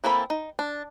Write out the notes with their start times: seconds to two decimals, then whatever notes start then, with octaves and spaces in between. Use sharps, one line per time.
0.04 E3 A#3 C4 A4 B5
0.30 D#4
0.59 D4